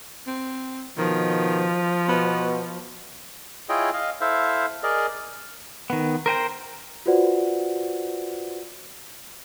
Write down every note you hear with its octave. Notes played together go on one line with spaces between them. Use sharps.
C4
B2 D#3 F3
B2 B3
E4 F4 G#4 C#5 D#5 G5
D#5 F5
E4 A4 C5 E5 F5
G#4 A#4 D5 D#5
D#3 B3
A#4 C5 G5 A#5
F4 F#4 B4 C5 D5 F#5